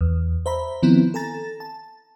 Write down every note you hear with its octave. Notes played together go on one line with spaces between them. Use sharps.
E2
C5 E5 A#5 B5
D#3 F3 B3 C4 E4
A4 G#5 A#5 A6
A5